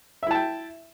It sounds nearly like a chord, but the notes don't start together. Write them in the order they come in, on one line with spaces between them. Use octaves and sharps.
E5 E4 A5 G5